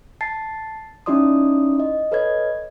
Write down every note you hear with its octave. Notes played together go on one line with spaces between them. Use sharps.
A5 A6 C7
C#4 D#4 E4 D5 C6 D#6
D#5
A4 B4 C#5 D#5 G#6